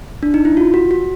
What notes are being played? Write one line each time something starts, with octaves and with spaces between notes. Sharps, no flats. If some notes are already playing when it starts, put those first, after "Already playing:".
D4
D#4
E4
F4
F#4
F#4